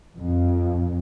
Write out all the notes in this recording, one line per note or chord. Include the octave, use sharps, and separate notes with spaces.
F2